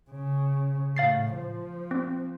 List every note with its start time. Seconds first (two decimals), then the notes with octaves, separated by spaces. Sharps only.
0.10 C#3
0.96 A2 F5 A6 C7
1.35 F3
1.91 C4